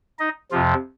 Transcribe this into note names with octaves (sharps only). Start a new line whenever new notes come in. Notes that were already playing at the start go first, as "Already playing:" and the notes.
D#4 D#5
F2 C3 F3 F4